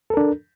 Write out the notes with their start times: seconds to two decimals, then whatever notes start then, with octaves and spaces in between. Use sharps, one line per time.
0.10 A4
0.14 A#4
0.17 D4